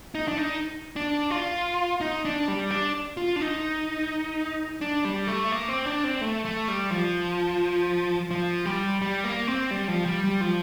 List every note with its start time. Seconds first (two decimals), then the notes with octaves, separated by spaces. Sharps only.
0.15 D#4
0.28 D4
0.37 D#4
0.96 D4
1.30 F4
2.01 D#4
2.25 D4
2.48 G3
2.71 D4
3.17 F4
3.36 D4
3.41 D#4
4.81 D4
5.05 G3
5.27 A3
5.52 A#3
5.69 C4
5.86 D4
6.04 C4
6.21 A3
6.45 A3
6.68 G3
6.91 F3
8.31 F3
8.65 G3
9.02 G3
9.24 A#3
9.47 C4
9.71 G3
9.88 F3
10.06 G3
10.24 G3
10.41 F3